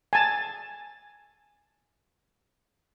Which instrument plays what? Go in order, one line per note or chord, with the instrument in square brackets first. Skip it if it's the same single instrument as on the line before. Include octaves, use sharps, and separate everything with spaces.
[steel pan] G#5 A5